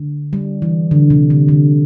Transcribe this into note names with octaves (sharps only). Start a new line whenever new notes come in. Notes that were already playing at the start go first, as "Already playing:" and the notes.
Already playing: D3
G3
E3
D3
C3
D3
D3